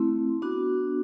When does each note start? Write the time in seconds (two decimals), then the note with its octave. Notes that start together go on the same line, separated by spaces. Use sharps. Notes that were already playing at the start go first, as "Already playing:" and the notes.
Already playing: A3 C4 E4
0.42 B3 D4 F#4